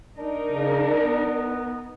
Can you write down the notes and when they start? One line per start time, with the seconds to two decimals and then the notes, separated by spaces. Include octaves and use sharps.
0.18 D4 D#4 A#4
0.49 C#3
1.00 B3